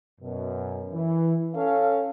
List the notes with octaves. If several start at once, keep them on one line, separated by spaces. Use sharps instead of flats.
F#2 B2
E3
C#4 A4 F5